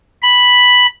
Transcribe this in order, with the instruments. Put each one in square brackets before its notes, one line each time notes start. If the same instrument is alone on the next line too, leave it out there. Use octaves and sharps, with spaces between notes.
[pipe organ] B5